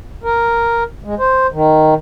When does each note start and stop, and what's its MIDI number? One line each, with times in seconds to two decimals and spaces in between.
0.23 0.83 70
1.04 1.15 56
1.19 1.47 72
1.52 1.94 51